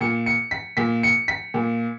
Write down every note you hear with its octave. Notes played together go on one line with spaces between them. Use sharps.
A#2 C#7
C#7
B6
A#2 B6
C#7
B6
A#2